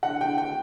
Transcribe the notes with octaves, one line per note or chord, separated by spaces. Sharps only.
D3 F#5
D3 G5
G5